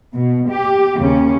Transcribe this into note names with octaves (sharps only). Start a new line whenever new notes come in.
B2
G4
D#2 C#3 C#4